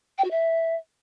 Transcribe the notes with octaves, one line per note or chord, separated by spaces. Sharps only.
G5
F#4
E5